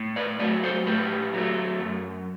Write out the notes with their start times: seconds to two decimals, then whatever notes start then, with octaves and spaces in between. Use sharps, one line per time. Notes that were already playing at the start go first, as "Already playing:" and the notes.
Already playing: A2
0.16 B4 D5
0.39 F#3 A3 B4 D5
0.63 A4 C5
0.86 A2 G4 B4
1.34 F#3 A3
1.80 F#2